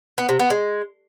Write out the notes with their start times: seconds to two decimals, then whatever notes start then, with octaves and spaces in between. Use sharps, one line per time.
0.18 B3
0.29 C3
0.39 B3
0.50 G#3